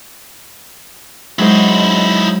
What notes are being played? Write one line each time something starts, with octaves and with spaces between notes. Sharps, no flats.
F#3 G#3 D#4 E4 C5